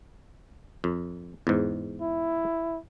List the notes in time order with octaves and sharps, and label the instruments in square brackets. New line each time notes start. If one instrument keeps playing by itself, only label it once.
[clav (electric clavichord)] F2
E2 G#2
[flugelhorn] E4